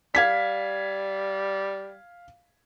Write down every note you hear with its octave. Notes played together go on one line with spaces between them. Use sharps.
G3 F5 G#6 B6